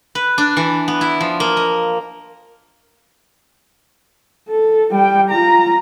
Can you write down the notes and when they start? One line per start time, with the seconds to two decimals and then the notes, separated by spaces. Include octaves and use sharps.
0.15 B4
0.38 D4
0.57 E3
0.88 B3
1.01 E4
1.20 F3
1.40 A#3
1.57 D#5
4.49 A4
4.91 G3 G5
5.30 F4 A#5